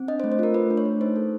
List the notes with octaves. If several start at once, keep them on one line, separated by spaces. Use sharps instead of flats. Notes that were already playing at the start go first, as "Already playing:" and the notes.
Already playing: C4
D4 D#5
C5
A3
C5
F4 A#4
A3 B4
D4
C#5
A3
D#4 C5
A4